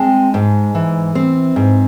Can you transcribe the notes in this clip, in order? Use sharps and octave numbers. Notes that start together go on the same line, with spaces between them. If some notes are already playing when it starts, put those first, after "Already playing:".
Already playing: G#3 C4 A5
G#2
E3
C4
G#2